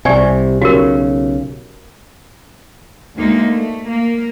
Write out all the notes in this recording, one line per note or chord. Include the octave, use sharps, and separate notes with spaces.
C2 C3 G4 D5 G#5
B1 C#3 F#4 G4 A#4
D2 G#3 A#3 D#4
A3
A#3